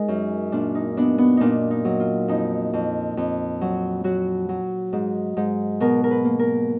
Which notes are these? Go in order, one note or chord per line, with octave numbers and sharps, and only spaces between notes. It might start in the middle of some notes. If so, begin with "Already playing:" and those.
Already playing: G#3 D#4 A#4
F#2
A#2 D4
D#4
B3 D4
B3
A#2 D4 D#4
D#4
F#3
F4
F2 D#4
F2
F2
F#3
F#3 F#4
F#3
G#2
G#2
B2 A#4
A#4
B4
A#3
A#4